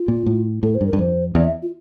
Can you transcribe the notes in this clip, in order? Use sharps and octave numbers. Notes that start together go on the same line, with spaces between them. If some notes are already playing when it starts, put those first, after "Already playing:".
Already playing: F4
A#2
A2
A2 A4
C5
G2
A#4
G2
F2 C5
E2 D5
E5
F4